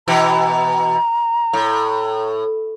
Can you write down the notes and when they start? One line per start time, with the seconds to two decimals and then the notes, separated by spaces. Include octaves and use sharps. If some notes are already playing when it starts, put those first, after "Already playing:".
0.08 B2 E3 A#5
1.53 A2